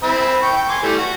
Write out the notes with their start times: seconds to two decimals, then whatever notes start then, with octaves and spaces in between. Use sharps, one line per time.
0.03 C4 E5 B5
0.42 G5 C#6
0.56 G5
0.69 G#5 C6 D6
0.82 E3 G3 A3
0.98 F#4